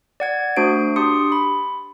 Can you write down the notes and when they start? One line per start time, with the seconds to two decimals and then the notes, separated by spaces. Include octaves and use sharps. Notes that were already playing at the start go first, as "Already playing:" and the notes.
0.20 D5 F#5 G#6
0.57 A3 D4 F#4 C5 D7
0.96 D4 G4 C6 D#6 C#7
1.32 B5